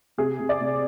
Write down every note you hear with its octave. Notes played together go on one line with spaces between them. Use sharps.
C3 G#4
C3
D5
C3